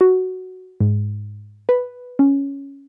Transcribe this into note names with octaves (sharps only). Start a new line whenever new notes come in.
F#4
G#2
B4
C#4